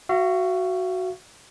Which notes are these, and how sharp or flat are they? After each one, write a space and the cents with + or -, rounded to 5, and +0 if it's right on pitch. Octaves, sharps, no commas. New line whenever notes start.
F#4 +0 F5 -45